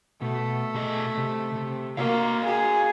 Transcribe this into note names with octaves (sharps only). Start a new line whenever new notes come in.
B2 A3
B2 G#4 D#5
C3
C3
A#3 F#4 D#5 F5
G#4